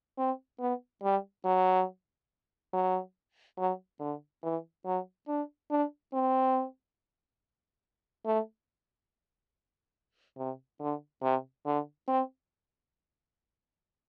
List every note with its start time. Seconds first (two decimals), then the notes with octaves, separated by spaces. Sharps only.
0.18 C4
0.60 B3
1.03 G3
1.45 F#3
2.73 F#3
3.58 F#3
4.00 D3
4.43 E3
4.85 F#3
5.28 D4
5.71 D4
6.13 C4
8.26 A3
10.37 C3
10.80 D3
11.22 C3
11.66 D3
12.08 C4